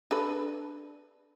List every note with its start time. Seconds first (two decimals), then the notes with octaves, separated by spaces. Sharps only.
0.11 D4 A4 B4